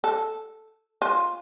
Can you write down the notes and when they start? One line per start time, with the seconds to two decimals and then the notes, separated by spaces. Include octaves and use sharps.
0.04 A4
1.02 F4